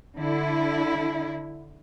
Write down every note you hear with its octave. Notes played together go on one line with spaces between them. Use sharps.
D3 E4